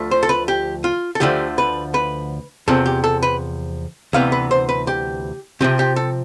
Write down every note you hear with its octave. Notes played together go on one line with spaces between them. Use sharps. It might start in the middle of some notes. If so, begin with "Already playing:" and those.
Already playing: D2 F3 A3
C5
A4
B4
G4
F4
A4
D2 D3 F3 A3 G4
B4
B4
E2 C3 F3 C4 A4
G4
A4
B4
D2 C3 E3 B3 F5
B4
C5
B4
G4
C3 F3 C4 G4
G4
A4